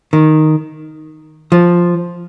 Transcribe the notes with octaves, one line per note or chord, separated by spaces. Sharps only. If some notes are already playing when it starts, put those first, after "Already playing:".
D#3
F3